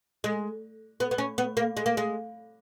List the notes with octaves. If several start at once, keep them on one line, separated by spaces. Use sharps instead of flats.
G#3
B3
B3
C#4
B3
A#3
G#3
A#3
G#3